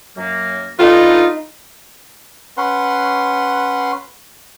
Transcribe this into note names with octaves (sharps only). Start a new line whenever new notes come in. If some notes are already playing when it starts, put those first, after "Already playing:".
F#2 F#3 A#3
D3 D#4 F4 A4 B4
C#4 B4 F#5 C6